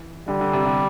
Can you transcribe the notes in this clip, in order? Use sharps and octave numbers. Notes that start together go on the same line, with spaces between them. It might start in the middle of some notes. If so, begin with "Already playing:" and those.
Already playing: E3
D3 G3
D3
C3
D3